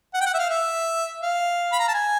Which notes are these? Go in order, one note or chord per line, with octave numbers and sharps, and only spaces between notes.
F#5
G5
F#5
E5
F5
E5
F5
B5
A#5
A5
G#5